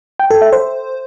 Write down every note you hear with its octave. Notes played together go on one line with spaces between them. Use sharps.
G5
A4
E5
C5